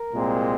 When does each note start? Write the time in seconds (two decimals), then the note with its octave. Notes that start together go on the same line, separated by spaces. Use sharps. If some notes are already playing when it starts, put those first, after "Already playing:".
Already playing: A#4
0.12 C2 A#2 G#3 C4